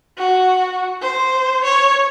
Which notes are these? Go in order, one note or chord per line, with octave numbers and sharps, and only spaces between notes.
F#4
C5
C#5